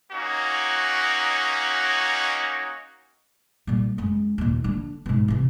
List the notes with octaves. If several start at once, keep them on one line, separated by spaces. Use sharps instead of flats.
A#3 C#4 D#4 F#4
A#2 G3
F#2 G#3
D#2 A#2
D3 D4
G#2 B2
C3 E3